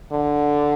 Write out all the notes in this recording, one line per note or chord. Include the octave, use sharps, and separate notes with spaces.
D3